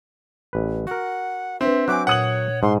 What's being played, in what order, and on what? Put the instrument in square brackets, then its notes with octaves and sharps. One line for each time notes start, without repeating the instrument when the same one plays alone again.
[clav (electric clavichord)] A1 B4
[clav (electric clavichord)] F#4 A#4 [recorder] F#5
[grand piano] C4 [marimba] D4 B4 [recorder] E5
[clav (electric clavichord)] F#3 E5 G5 [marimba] G#5 F#6 [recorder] D6
[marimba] A#2 [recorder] C#5 [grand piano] F#5 D#6 F#7
[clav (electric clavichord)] G#2 [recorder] C6